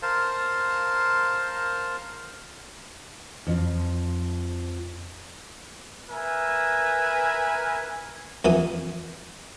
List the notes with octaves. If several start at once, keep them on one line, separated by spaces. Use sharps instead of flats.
A#4 C5 F5 A5
F2 F3
A#4 B4 E5 G#5
F2 E3 D#6